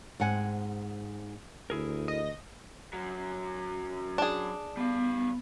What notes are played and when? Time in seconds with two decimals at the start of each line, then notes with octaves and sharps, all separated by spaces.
0.20 G#2 C4 F#5 G#5
1.70 D2 E4 G#4 A#4
2.08 D#5
2.93 F#2 F#3
4.18 D4 G#4
4.77 G3 B3 F5